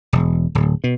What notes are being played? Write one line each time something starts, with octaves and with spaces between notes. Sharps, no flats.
E1
D1
B2